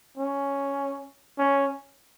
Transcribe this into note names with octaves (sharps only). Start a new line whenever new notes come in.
C#4
C#4